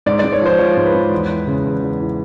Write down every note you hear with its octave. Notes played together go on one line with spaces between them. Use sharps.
G#2 D5
G#2 D5
C#5
F3 C5
F3 C#5
G#2
B4
G#2
E2
E3
C#3
E2
E2
E3